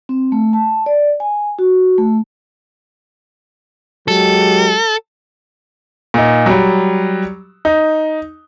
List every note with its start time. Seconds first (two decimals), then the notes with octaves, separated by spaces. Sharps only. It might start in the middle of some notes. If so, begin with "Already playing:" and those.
0.09 C4
0.32 A3
0.53 A5
0.86 D5
1.20 G#5
1.59 F#4
1.98 A3
4.08 F#3 G#3 G4 A4
6.14 A#2 D#4
6.46 F#3 G3
7.65 D#4